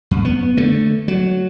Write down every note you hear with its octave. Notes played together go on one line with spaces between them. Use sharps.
F2
B3
D3 A3
F#3